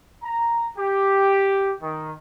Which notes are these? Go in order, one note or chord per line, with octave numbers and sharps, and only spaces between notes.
A#5
G4
D#3